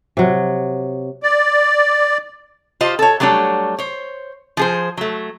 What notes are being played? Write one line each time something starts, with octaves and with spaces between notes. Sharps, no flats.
C3 F#3
D5
F4 G4 C5 D#5
A4 C#5
F#3 G3 A3 D4 C#5
C5 C#5
F3 G#4 C5
F#3 A3